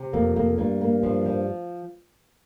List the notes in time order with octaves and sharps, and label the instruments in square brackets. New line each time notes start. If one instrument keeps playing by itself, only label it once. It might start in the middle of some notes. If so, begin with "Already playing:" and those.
Already playing: [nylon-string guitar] C3
[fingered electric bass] F2 [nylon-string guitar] A#3
[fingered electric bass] F2 [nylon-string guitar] A#3
[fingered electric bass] G2 [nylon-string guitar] A#3
[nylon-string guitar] A#3
[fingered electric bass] G2 [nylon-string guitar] F3
[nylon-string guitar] F3